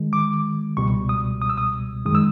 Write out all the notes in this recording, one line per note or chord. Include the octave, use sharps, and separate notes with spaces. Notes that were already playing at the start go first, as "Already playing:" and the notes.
Already playing: D#3 G#3
D6
C#2 B2 G3 C#6
D#6
D#6
E6
D#6
F#2 D#3 G#3 D#6
E6